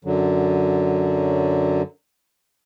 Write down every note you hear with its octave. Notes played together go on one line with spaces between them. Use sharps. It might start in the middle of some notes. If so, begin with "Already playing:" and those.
F#2 D3 F#3